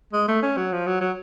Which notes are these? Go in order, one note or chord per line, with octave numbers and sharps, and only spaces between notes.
G#3
A3
C#4
F#3
F3
F#3
F#3